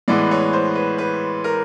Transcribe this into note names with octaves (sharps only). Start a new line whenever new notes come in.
A2 E3 G#3 B3 D5
C#5
C5
B4
B4
A#4